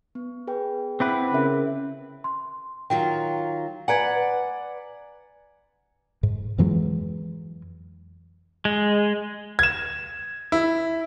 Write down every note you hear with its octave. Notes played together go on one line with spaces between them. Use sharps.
B3
G#4 B4 G5
C4 E4 B4 F#5 G5 D6
C#3 A#4 E5
C6
D#3 F#3 F4 G5
B4 D5 F#5 G#5 A#5 G#6
G#2
F2 E3 F#3 G#3
G#3
G#6 E7
E4